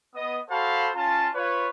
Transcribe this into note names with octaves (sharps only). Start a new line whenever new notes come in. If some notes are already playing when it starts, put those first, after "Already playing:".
B3 D#5 D#6
F#4 A4 C5 F5 A5 B5
C#4 F4 A5
F4 B4 C#5